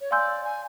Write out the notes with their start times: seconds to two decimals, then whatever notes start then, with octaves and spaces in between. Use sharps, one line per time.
0.01 C#5
0.11 D5 F5 G#5 C6 E6 G6
0.44 G#5